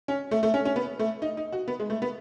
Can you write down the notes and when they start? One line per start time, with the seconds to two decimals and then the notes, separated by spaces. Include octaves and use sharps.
0.08 C#4
0.31 A3
0.43 A3
0.54 C#4
0.65 C#4
0.76 B3
0.99 A3
1.22 D#4
1.37 D#4
1.52 F#4
1.68 B3
1.80 G#3
1.90 A3
2.02 B3